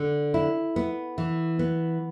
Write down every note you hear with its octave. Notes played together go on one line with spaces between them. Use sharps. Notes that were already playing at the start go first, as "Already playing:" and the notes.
Already playing: D3
E4
B3
E3
B3